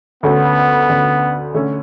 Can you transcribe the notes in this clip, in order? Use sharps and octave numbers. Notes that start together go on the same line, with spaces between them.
D2 D3 A3 B3 C#4 F#4
D2 D3 A3 C#4 F#4
D3 A3 C#4